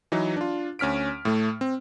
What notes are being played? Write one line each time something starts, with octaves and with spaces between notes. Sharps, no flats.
E3 F#3 D#4 B4
D4 F4
D2 C#4 F6 B6 D7
A2 A3
C4